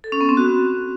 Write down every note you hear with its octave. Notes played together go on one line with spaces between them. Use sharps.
A4
C#4
B3
C4
F#4